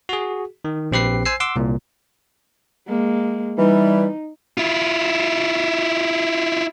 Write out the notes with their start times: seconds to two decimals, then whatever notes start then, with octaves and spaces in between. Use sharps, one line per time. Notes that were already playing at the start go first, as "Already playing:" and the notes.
0.09 F#4 G#4
0.65 D#3
0.92 A#1 C4 G4 B4 C7
1.26 C5 G#5 E6 C7
1.40 F#5 C6 D6 E6
1.56 C2 A#2
2.88 G#3 A#3
3.58 E3 G3 D#4
4.58 E4 F4